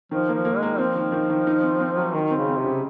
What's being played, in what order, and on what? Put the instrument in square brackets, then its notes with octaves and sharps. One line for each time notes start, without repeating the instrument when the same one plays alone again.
[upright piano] D#3 [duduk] F3
[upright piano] A#3
[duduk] F3
[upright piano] A#3
[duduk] G#3
[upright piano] A#3
[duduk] F3 [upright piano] C4
[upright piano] D#3
D#3
D#3
D#4
C4
C4
F#3
[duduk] D#3 [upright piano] D#4
[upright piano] C4
[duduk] C#3
[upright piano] C4
[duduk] C3
[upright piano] C#3